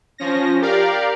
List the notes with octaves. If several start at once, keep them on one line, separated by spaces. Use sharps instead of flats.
F3 C#4 A#6
G4 A#4 D5 F5